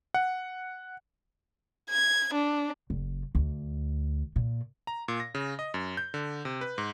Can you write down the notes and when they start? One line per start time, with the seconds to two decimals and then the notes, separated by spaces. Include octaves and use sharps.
0.14 F#5
1.90 G#6
2.34 D4
2.90 F#1
3.35 D2
4.36 A#2
4.87 A#5
5.08 A#2
5.20 A#6
5.35 C#3
5.59 D#5
5.74 F#2
5.97 G6
6.14 D3
6.45 C3
6.61 B4
6.78 G#2